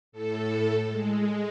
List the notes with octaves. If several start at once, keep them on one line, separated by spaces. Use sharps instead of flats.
A2 A4
G#3